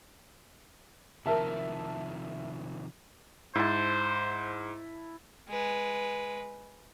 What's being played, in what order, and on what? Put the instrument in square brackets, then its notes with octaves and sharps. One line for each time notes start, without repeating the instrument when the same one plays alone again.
[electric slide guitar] C3 D#3 F3 [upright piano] A#4 E5 A5
[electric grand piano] G#2 [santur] E4 A5 [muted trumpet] C5
[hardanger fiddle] G#3 B4